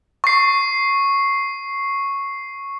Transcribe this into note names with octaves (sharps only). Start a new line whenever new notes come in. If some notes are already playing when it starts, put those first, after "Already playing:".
C#6 C7